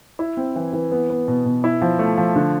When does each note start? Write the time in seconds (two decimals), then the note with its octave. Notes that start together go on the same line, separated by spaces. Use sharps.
0.19 E4
0.37 C4
0.56 E3
0.73 E3
0.92 B3
1.10 B3
1.28 B2
1.46 B2
1.64 E4
1.82 F3
1.99 A3
2.18 F3
2.36 D3